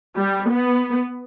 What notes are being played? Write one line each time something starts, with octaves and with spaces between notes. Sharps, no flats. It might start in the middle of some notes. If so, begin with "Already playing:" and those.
G3
B3